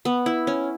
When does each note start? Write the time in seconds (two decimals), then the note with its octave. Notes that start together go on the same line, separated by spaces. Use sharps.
0.05 B3
0.26 E4
0.47 C#4